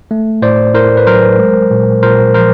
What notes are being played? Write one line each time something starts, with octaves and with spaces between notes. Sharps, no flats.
A3
A2 C5 D5
A2 A#4 C5
B4
F#3 A#4 C5
G#3
A#2
A#2 A#4 C5
F3 A#4 C5